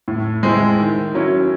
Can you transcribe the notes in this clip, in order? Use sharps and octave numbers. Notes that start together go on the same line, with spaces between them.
A2
G#3 C4 E4
D#3
F#3 C#4 E4